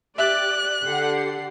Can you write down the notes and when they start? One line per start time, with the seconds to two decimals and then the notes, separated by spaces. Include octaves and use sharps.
0.18 G4 D5 E5 F#6
0.84 D3 G4 A4 F#5 C7